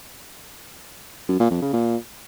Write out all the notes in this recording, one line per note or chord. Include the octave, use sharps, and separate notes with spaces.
F#2
A#2
F2
C#3
A#2